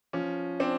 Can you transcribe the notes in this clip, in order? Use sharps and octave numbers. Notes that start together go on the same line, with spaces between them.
F3 C#4
C4 D4